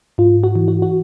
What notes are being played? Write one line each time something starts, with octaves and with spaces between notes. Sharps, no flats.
G#2 F4
F#4
E3
F#4
F#4